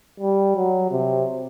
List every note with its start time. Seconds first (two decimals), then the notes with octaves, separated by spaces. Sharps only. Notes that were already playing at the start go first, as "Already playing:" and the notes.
0.20 G3
0.56 F#3
0.91 C3